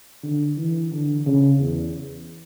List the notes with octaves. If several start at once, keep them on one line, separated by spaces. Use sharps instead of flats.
D3
E3
D3
C#3
E2